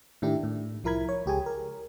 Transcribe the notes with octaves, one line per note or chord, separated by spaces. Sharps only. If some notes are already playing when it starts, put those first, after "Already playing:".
A2 D#3 D4 E4 G4
A2
C2 F3 E4 A#4 B5 G#6
C#5
C#2 G4 G#4 G#5
A#4